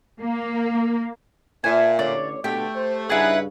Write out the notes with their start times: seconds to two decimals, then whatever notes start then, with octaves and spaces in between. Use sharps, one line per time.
0.21 A#3
1.64 A#2 C5 E5 G#5 A5
1.99 A1 D3 C#5 D5
2.44 B2 D3 A3 G4 G5
2.76 C5
3.10 G2 C#3 D#4 E4 G#4 B4 F#5